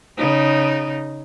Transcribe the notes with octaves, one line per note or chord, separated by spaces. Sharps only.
C#3 D#4